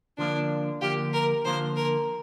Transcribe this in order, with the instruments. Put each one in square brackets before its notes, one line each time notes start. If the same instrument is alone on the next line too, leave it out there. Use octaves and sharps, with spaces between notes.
[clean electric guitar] D3 F3 A#3 F4 [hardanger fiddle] D4
[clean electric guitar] D3 F3 A#3 F4 [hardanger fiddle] G4
[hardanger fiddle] A#4
[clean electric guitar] D3 F3 A#3 F4 [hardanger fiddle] C5
[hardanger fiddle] A#4